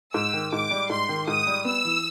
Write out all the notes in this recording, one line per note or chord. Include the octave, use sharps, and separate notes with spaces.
G#2 E6
D#3
G#2 D6
G3
G#2 C6
D#3
G#2 D#6
G3
B3 E6
E3